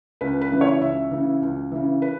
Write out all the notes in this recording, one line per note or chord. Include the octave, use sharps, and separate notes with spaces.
C#2 B4
B4
C#3 E3
C#5
C#2 E5
C#3 E3
C#2
C#3 E3
B4